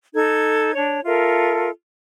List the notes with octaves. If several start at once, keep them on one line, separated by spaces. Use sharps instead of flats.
D#4 A4 G#6
D4 C#5
F4 A4 A#4 E5